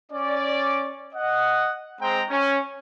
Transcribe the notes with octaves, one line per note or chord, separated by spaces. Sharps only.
C#4 D5
D#5 F#5
G#3 C4 C5 G5 A#5
C#4